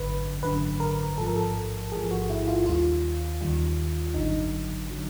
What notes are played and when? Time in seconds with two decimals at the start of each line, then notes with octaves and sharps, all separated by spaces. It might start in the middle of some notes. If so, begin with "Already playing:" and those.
Already playing: G#1 F#2 D3 B4
0.43 G#1 F#2 D3 B4
0.80 A#4
1.18 A1 G#2 F3 A4
1.27 A#4
1.36 A4
1.91 A1 G#4
1.95 G#2 F3
2.11 F#4
2.30 E4
2.48 F4
2.66 D#2 D#3 G3 F4
3.41 D#2 D#3 G3
4.14 G#1 F#2 D3 F#3 D#4
4.90 D3 F#3